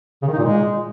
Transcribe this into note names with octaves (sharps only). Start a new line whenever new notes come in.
C#3
D#3
D#4
A#2
G#3